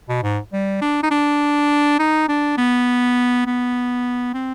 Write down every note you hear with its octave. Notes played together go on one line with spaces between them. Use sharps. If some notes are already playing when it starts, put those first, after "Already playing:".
B2
G#2
G3
D4
D#4
D4
D#4
D4
B3
B3
C4